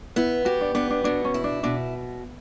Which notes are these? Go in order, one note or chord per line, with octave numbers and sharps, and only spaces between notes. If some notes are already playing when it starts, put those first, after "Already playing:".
B3 E4
F#4 G4
D4
B3 D4
D4
B2 D4
C#4
E4
D4
B2 D4